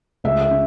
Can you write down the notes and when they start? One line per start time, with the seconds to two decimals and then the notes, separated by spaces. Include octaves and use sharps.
0.24 C#2 E5
0.41 E5
0.50 C#4